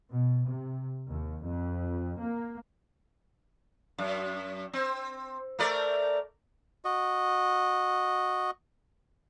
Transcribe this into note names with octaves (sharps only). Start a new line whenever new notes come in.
B2
C3
D#2
F2
A#3
F#2
C4
A3 A#4 D5
F#4 D#5